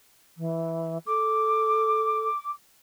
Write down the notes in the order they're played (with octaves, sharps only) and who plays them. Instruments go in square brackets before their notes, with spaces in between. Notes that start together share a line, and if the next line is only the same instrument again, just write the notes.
[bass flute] E3
[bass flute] A4 [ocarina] D6